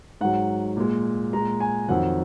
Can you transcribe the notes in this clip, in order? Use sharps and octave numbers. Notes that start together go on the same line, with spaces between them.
G#2 F#3 F#5
A#2 G#3
A#2 G#3 A#5
G#5
F2 D#3 F#3 F#5